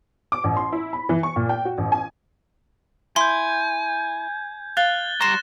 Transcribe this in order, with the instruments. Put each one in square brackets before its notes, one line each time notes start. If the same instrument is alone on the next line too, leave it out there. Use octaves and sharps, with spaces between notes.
[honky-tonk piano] D6
A1
C6
E4
B5
E3
C#6
A#2
G5
F#4
A1
G#5
[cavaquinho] E4 [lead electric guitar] G#5 [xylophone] C6 [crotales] G6 G#6
[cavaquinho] F5 [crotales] F#6 A6 G7
[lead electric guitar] G3 A#5 [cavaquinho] C6 C#6 [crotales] A#6 E7